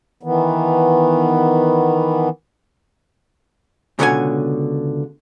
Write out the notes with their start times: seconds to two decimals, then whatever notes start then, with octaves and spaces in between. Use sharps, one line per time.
0.23 D#3 E3 B3
3.99 C#2 B2 D3 C#5 F#5 G#5